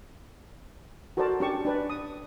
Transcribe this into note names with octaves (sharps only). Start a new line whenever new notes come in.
F#4 A4 A#4 C5 D5 A5
C#4 D4 G4 A5 C#6
D4 B4 D5
D#6